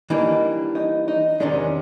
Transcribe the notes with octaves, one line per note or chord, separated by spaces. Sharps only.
E3 G3 A#3 D4 D#4
D#4
D#4
E2 C3 D#3 G#3 C#4 D4